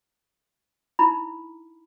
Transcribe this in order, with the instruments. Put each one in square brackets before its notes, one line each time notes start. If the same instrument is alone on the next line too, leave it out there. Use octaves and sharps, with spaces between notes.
[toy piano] D#4 E4 A#5 B5